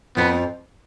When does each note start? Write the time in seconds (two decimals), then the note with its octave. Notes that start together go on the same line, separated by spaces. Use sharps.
0.16 F2 F3 B3